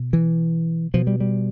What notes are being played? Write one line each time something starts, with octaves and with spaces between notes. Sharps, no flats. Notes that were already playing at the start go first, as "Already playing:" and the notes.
Already playing: B2
E3
B2 F3
G3
G3